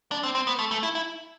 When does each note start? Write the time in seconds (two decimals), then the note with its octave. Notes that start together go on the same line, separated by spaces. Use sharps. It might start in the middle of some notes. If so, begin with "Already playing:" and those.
0.12 D4
0.23 C4
0.35 C4
0.47 B3
0.59 A3
0.71 A3
0.83 E4
0.95 E4